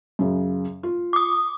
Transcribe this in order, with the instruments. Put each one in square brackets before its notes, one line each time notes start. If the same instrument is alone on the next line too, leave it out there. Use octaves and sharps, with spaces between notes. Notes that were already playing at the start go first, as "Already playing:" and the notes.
[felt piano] F#2 C#3
F4
[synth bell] D6 D#6